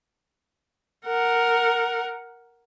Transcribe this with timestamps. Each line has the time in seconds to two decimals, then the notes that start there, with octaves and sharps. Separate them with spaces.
1.06 A#4 F#5